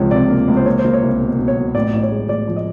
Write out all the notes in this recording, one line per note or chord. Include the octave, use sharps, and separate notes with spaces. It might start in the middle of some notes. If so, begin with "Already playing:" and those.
Already playing: C#2 C3 F3 C#5
C3 D5
A#3
C#2
C5
A#3 C#5
C5
A#3
C#5
C2
B2
B2
C#5
F#3
A1 D5
A1
C#5
G#3
A1 D5
F3
D#5